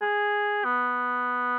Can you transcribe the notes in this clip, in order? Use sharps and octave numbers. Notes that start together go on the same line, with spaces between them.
G#4
B3